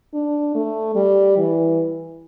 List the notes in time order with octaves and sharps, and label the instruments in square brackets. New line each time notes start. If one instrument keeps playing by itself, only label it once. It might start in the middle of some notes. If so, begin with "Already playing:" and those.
[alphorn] D4
A3
G3
E3